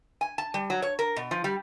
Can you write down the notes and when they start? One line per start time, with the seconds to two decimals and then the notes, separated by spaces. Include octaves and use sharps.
0.21 G#5
0.38 A5
0.54 G3
0.70 F#3
0.82 C#5
0.99 A#4
1.16 B2
1.31 F3
1.44 G3